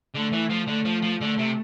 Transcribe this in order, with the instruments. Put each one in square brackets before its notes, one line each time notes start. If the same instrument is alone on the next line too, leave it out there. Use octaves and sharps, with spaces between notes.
[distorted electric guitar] D3 [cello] A3
[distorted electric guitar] E3
F3
[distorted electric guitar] D3 [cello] A3
[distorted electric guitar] F3
F3
[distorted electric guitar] D3 [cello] A3
[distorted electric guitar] C3